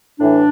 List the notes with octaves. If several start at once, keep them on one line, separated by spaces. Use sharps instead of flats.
A2 E3 D4